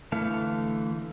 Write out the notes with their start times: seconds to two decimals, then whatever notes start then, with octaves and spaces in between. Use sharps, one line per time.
0.12 D3 E3 A3 F5